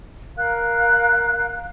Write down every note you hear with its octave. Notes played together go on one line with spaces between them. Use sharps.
A#4 F5 F#6